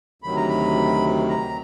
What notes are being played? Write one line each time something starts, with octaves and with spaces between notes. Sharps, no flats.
D2 C3 D#3 F#3 B5
A#5
B5
A#5